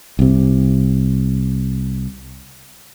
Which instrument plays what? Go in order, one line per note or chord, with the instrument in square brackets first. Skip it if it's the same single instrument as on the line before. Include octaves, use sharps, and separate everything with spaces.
[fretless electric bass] C2 C3